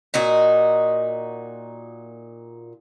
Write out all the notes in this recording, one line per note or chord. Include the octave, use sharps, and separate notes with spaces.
A#2 D#4 F#4